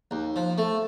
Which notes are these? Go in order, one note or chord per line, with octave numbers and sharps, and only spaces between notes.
D#2
F3
A3